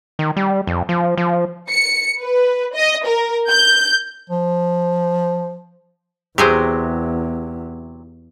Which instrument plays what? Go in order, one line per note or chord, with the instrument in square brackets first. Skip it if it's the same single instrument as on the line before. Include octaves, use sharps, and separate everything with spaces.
[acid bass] D#3
G3
F2
F3
F3
[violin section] C#7
B4
D#5
A#4
G6
[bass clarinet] F3
[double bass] E2 [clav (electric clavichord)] C3 F#3 [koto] G4 G#4 C5